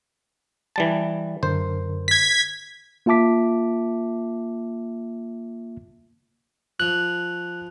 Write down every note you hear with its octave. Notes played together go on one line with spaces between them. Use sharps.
E3 G3 A5
F#2 D3 A#4 C5
G#6 B6
A#3 F4 E5 A5 D6 B6
F3 F#6